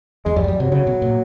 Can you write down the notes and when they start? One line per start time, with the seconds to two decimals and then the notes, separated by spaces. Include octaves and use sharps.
0.25 E2 G#3
0.36 F2 G3
0.44 G2
0.48 F#2 G3
0.60 C3 F#3
0.72 C#3 F#3
0.87 B2
1.02 A#2